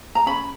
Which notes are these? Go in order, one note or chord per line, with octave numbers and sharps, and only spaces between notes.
A#5
C#4 B5